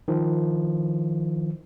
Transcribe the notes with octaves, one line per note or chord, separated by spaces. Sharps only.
D#3 F3